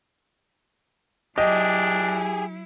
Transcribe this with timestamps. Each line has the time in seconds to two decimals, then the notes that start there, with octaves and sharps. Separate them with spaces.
1.38 F#3 D4 E4 G4 G#4 D#5